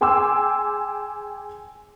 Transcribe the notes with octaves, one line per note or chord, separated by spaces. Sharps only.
G#4 G5 G#5 C6 D6 E6